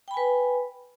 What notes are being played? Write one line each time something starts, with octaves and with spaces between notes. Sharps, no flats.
B4 G5 G#5 B5